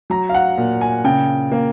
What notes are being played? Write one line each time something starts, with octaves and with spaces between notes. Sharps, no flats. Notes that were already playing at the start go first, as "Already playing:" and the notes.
F#3 A#5
F5
F#5
A#2
G#5
C#3 G5
A#3